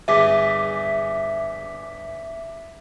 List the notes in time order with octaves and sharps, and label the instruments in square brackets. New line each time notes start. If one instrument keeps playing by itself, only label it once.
[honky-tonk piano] G1 G#4 [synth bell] E5 D6 B6